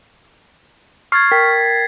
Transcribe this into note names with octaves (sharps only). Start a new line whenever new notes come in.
C#6 F6 G#6 A6 C7
A#4 G5 B6